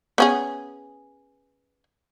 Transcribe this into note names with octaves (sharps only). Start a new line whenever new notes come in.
B3 C#4 G#4